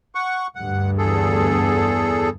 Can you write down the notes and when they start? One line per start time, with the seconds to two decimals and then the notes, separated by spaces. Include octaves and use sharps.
0.15 F#5 C#6
0.55 D2 G2 F#5
0.98 E2 G#4 A4